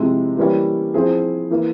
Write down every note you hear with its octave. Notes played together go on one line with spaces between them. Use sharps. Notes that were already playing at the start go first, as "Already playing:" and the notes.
Already playing: C3 F3 G#3 E4
E3 G3 A#3 C#4 E4
F3 C4 E4 G#4
E3 A#3 E4